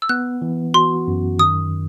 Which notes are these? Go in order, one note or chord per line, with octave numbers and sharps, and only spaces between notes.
E6
B3 F#6
E3
F#4 C6
F#2
D#3 D#6